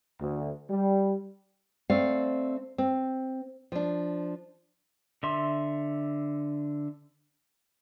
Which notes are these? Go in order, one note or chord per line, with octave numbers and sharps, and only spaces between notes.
D2
G3
A3 C4 D5 F5
C4
F3 D4
D3 E5 C6